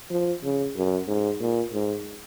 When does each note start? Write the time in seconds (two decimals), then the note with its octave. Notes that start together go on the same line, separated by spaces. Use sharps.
0.11 F3
0.43 C#3
0.76 F#2
1.08 G#2
1.40 A#2
1.73 G#2